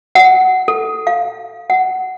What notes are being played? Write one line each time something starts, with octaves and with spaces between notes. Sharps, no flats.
F#5
A4
F5
F#5